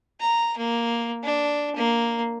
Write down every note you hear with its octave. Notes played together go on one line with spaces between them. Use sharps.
A#5
A#3
D4
A#3